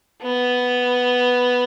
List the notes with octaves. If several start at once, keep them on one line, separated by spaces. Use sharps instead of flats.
B3